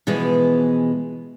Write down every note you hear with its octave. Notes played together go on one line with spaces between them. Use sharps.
B2 E3 F3 G#3